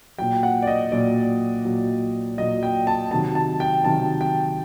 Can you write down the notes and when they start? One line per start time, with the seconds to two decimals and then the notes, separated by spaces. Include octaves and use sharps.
0.18 A#2 F#3 G5
0.43 F#5
0.62 D5
0.67 D#5
0.92 A#2 F#3 D5
1.65 A#2 F#3
2.38 A#2 F#3 D#5
2.63 G5
2.87 A5
3.11 C3 D#3 F#3 A5
3.35 A5
3.60 G5
3.84 C3 D#3 F#3 A5
4.21 G5